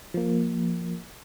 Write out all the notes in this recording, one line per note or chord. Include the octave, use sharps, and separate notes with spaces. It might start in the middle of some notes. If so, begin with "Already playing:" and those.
F3 A#3